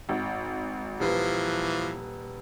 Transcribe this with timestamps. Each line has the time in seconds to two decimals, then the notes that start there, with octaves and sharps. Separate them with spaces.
0.09 G#1
1.00 D#1 E3 F3 B4